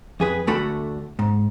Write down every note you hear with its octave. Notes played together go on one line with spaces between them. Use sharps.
F2 G#4 B4
D2 D3 A3 D4 F#4 B5
G#2